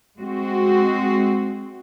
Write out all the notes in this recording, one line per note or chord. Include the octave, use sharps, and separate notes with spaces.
G#3 C4 F#4